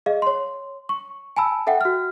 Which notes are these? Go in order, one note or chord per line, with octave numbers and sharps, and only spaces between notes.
G#4 D#5 F5
C#5 C6
C#6
G#5 A5 B5 E6
A4 E5 F#5 G5
F#4 F6